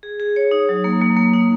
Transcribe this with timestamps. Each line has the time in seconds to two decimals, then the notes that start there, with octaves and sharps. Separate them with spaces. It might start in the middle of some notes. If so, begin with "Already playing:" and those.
0.03 G#4
0.20 G#4
0.36 C#5
0.51 D#4
0.69 F#3
0.84 A#3
1.01 A#3
1.16 A#3
1.33 D#4